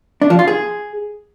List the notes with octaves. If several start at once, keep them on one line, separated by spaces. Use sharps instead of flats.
D4
F3
F4
G#4